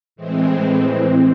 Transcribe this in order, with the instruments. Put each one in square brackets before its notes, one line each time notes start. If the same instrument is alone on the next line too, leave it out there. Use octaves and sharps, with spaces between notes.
[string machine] A2 E3 G#3 C4